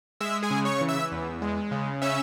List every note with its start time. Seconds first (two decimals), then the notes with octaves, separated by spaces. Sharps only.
0.21 G#3 E5 E6
0.43 G#4 G#5
0.51 C#3
0.65 C#5 C#6
0.81 E3
0.88 E5 E6
1.12 E2
1.42 G#3
1.71 C#3
2.02 C#4 E5 E6